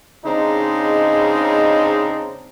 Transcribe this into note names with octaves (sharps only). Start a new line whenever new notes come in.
C#3 G#3 C4 D4 D#4